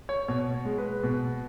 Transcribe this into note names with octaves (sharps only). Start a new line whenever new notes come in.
C#5
B2 C#5
G#3
B4
B2